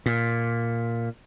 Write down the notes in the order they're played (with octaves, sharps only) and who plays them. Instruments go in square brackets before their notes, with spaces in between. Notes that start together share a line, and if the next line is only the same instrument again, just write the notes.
[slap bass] A#2